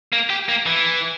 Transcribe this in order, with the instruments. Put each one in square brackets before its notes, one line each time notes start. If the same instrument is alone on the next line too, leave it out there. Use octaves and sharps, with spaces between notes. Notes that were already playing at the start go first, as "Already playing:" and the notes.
[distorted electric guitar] A#3
G4
A#3
E3